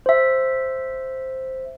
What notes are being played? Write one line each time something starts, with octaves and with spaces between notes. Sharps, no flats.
C5 E5